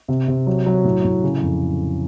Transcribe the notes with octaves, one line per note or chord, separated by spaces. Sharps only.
C3
C3
F#3
F#3
A2
A2
C#3
F2